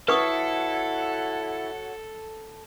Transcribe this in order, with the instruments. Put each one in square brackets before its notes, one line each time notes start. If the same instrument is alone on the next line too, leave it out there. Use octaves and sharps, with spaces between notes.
[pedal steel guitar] E4 [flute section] F#4 C#5 F#5 [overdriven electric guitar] A4 [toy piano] B4 C#6 D#6